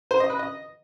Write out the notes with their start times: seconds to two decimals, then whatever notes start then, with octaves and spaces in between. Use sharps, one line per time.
0.11 C5
0.20 D#5
0.30 B4
0.39 D#5